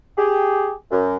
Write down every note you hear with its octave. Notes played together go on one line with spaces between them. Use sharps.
G4 G#4
F#2